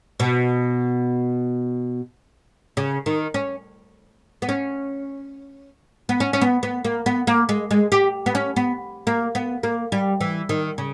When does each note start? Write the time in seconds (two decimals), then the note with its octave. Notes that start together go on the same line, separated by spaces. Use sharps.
0.20 B2
2.77 C#3
3.06 D#3
3.34 C#4
4.42 B3
4.49 C#4
6.09 B3
6.20 C#4
6.33 C#4
6.42 B3
6.63 B3
6.85 A#3
7.06 B3
7.27 A#3
7.49 G#3
7.71 G#3
7.92 G4
8.26 B3
8.35 C#4
8.56 B3
9.07 A#3
9.35 B3
9.63 A#3
9.92 G3
10.21 E3
10.49 D#3
10.78 C#3